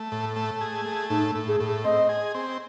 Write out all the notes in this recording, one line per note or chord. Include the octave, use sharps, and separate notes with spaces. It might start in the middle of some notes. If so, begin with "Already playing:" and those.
Already playing: A3
A2
A3
G#4
A3
A2 D#4
A2
G#4
A2
C4 D#5
G#4
C4